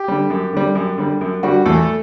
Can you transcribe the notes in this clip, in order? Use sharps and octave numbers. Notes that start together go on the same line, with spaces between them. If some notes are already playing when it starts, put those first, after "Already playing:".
Already playing: G4
D3 G3
F#2
D3 G3
F#2
D3 G3
F#2
D3 G3 F#4
E2 A3 A4